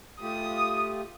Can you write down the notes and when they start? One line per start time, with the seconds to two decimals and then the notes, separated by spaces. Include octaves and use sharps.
0.21 A3 F4 G4 D#6